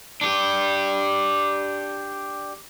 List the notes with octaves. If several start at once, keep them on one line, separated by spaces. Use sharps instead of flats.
D4 G4